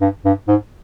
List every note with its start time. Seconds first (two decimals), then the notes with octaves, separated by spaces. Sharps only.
0.01 G2
0.25 G2
0.48 G#2